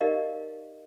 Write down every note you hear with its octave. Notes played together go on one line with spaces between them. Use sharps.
D#4 G4 A#4 D5 D#5 F5